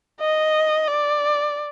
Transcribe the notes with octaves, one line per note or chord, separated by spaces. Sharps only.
D#5
D5